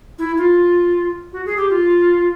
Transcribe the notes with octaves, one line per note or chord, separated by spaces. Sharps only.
E4
F4
F#4
G#4
G4
F4